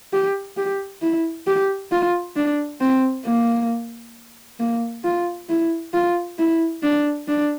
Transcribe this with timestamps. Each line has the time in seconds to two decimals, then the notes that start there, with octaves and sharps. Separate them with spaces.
0.13 G4
0.57 G4
1.02 E4
1.47 G4
1.92 F4
2.36 D4
2.81 C4
3.26 A#3
4.60 A#3
5.04 F4
5.49 E4
5.94 F4
6.39 E4
6.83 D4
7.28 D4